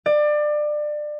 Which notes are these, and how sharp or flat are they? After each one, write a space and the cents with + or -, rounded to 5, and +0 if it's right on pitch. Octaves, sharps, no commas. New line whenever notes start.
D5 +25